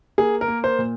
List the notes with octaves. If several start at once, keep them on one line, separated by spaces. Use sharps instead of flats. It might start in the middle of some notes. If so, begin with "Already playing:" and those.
A#3 G#4
A#4
A#3
C5
A#2